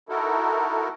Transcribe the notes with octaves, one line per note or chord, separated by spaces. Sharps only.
D#4 E4 F#4 A4 A#4